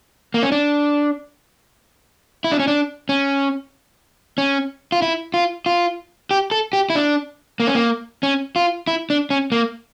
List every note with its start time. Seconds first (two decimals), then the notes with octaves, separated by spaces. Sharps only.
0.34 A#3
0.43 C#4
0.52 D4
2.44 E4
2.52 D4
2.59 C#4
2.67 D4
3.09 C#4
4.38 C#4
4.92 F4
5.02 E4
5.34 F4
5.66 F4
6.31 G4
6.51 A4
6.73 G4
6.90 E4
6.95 D4
7.60 A#3
7.67 C#4
7.75 A#3
8.23 C#4
8.56 F4
8.87 E4
9.10 D4
9.30 C#4
9.52 A#3